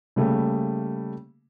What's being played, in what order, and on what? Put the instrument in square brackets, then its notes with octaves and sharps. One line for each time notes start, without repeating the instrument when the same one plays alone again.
[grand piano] C#3 G3 A3 A#3